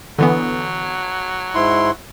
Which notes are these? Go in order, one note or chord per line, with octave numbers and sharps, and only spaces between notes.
D3 E3 F#3 B3
G#2 E4 C6